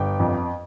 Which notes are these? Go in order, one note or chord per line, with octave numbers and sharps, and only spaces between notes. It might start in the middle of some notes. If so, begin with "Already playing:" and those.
Already playing: G1 G5
F2